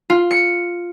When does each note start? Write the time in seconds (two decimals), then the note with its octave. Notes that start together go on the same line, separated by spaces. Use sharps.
0.10 F4
0.31 C#7